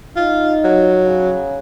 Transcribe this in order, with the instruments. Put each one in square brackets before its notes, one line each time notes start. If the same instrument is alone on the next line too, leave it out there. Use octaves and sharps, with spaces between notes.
[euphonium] D#4 [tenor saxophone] F4
[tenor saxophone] F#3
[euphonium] C#3